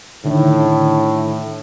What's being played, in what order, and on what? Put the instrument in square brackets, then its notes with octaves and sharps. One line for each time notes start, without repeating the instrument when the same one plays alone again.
[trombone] A2 [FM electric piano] D3 D#3 D4